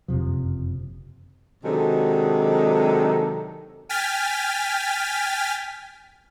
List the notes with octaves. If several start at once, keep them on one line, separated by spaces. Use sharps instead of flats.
F#1 F2 C3 F3
C3 D#3 F#3 G#3 D4 A4
G5 G#5 F6 A6 B6